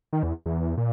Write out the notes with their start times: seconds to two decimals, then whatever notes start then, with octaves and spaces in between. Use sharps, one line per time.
0.13 D#3
0.23 E2
0.46 E2
0.77 A#2